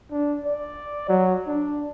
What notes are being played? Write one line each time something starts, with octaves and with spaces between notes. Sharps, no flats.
D4
D5
F#3
D4